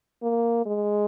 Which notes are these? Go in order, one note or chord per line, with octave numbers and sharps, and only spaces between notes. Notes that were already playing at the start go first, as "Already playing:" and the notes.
A#3
G#3